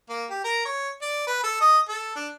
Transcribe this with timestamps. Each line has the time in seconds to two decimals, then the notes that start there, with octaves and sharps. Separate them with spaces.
0.10 A#3
0.30 G4
0.44 A#4
0.65 C#5
1.02 D5
1.27 B4
1.43 A4
1.61 D#5
1.89 A4
2.16 D4